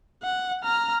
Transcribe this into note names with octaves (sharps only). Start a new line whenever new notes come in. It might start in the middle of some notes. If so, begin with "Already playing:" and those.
F#5
A#5 F6